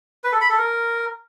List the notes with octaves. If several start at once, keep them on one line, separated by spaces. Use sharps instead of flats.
B4
A4
B5
A4
A#4